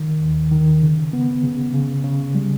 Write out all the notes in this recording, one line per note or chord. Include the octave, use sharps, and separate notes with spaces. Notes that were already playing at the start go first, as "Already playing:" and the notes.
Already playing: D#3
D#2
D#3
C#3
B3
C#3
C#3
C#3
G3